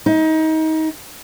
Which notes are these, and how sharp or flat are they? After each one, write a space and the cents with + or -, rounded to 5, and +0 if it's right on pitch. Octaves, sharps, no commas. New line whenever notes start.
D#4 +25